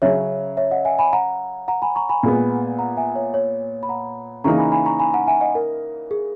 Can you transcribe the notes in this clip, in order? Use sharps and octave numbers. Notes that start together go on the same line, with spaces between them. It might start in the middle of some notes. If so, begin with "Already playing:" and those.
C#3 F#3 C#4 C#5 E5
C#5 E5
D#5 F#5
E5 G#5
G#5 B5
F#5 A#5
F#5 A#5
G#5 B5
A#5 C#6
G#5 B5
A#2 G#3 B3 G#5 B5
F#5 A#5
F#5 A#5
E5 G#5
C#5 E5
C#5
B5
F#5 A#5
C#3 E3 A#3 D#4 A#5 C#6
G#5 B5
G#5 B5
A#5 C#6
G#5 B5
F#5 A#5
E5 G#5
D#5 F#5
A#4
G#4